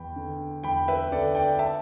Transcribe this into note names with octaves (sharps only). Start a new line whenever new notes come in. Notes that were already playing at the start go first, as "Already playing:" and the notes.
Already playing: E2 G5 B5
D3
E2 G5 B5
B4 E5
D3 A4 D5
D5 G5
E5 A5